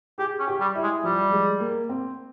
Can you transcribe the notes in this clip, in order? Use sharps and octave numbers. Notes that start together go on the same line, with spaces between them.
G4 G#4
C#4
G4
G3
E4
G#3
F3 G3
G#3
A#3
C4